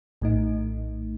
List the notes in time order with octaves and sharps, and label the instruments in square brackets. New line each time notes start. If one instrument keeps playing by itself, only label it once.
[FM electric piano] A#1 A2 A3 D#4